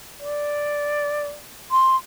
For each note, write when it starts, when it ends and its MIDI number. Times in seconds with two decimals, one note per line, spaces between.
0.22 1.37 74
1.71 1.96 84